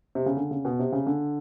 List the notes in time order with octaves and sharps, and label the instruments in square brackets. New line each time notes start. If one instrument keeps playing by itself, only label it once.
[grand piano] C3
C#3
D3
C#3
B2
C3
C#3
D3